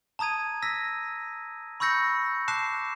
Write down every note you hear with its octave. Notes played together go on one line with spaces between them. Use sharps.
A5 A#5 D#6 G#6 D#7
E6 A#6 B6
B5 C#6 E6 G6 A#6 C#7
A5 D6 F#6 C7 E7